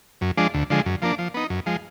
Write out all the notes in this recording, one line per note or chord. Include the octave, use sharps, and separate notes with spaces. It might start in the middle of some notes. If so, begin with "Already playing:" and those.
F#2
F3 G#3 D4
D2
D3 F3 G#3
F#2
F3 A#3 D4
F3
B3 D#4
F#2
F3 G#3